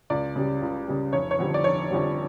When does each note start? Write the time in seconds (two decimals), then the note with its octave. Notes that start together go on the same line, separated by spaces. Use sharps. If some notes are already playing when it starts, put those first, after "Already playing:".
0.10 C#2 D5
0.36 C#3 G3
0.62 C#2
0.88 C#3 G3
1.13 F1 C#5
1.31 C#5
1.39 F2 D3 G3
1.54 D5
1.64 F1 C#5
1.90 F2 D3 G3